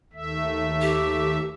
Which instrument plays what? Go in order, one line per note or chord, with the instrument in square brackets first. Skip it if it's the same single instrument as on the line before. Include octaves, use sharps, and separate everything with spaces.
[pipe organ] D#2 A3 E5
[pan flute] G4